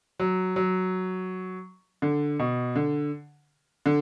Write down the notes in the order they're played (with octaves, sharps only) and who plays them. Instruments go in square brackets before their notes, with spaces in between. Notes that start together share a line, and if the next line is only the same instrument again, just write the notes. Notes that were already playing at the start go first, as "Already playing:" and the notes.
[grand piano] F#3
F#3
D3
B2
D3
D3